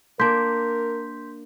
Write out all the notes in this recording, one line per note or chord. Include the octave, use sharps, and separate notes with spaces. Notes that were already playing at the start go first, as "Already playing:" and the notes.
A#3 D4 A#4 C6 G6 B6